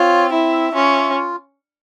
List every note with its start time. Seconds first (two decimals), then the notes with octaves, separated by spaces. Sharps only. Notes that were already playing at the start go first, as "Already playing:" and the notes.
Already playing: C4 F4 C#5
0.33 E4 E5
0.75 C#4 F4